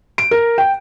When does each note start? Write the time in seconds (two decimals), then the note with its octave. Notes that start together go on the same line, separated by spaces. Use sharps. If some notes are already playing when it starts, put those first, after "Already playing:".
0.18 D7
0.31 A#4
0.58 G5